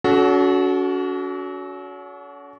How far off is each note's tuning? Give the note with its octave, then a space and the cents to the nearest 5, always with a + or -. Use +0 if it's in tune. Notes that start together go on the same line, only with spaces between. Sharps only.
C#4 +40 F#4 +0 A4 -30